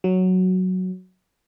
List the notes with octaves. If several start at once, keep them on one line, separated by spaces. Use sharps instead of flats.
F#3